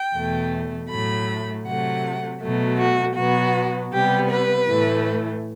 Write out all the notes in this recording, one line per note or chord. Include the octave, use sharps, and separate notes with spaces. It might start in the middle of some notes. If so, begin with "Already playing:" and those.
Already playing: G5
E2 B2 A3
A2 F#3 A3 B5
C3 F#3 A3 F#5
B2 F#3 A3
F#4
B2 F#3 B3 F#4
C3 G3 B3 G4
B4
A2 E3 A3